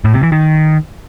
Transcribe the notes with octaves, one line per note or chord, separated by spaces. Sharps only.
A2
C3
E3
D#3